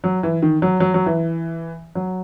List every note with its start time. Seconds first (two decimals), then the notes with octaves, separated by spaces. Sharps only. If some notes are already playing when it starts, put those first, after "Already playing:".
0.04 F#3
0.23 E3
0.42 D#3
0.62 F#3
0.80 F#3
0.94 F#3
1.06 E3
1.95 F#3